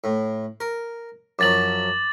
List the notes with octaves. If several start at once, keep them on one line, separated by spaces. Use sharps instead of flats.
A2
A#4
F#2 F3 F#3 D6 A6 F#7